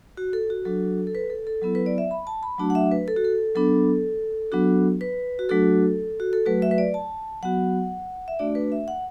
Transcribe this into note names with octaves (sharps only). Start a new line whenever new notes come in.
F#4
A4
F#4
F#3 D4 F#4 A4
A4
B4
A4
A4
F#3 B3 E4 A4
B4
D5
E5
B5
A5
B5
F#3 A3 D4 F#4 A5
F#5
E5
B4
A4
F#4
A4
F#3 B3 D4 A4
F#3 B3 D4 F#4
B4
F#4
F#3 A3 D4 F#4 A4
F#4
A4
F#3 A3 F#4 B4
E5
B4
D5
A5
F#3 B3 F#4 F#5
E5
A3 D4 F#4 D5
B4
E5
F#5